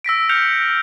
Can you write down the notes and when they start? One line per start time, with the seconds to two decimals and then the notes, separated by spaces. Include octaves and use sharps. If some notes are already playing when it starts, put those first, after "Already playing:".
0.04 E6 A#6 B6 D7
0.29 F6 G6 A#6 C#7 F7